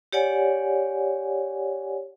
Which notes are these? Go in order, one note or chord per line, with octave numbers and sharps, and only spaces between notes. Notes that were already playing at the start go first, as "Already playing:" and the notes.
G4 C#5 D5 F#5 G#5